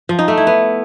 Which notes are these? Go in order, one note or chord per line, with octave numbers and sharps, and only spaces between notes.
F3
D#4
A3
E4
B3